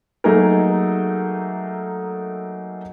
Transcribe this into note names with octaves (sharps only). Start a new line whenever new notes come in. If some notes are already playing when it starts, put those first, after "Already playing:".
F#3 A3 A#3 D#4 G#4 A#4